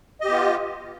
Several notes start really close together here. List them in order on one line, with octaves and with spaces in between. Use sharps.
D#5 G4 B3 F4